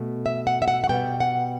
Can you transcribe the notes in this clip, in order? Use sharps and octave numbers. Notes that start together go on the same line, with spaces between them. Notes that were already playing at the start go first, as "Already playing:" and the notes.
Already playing: B2 A3
E5
F#5
E5
F#5
F#5
B2 G3 B3 G5
F#5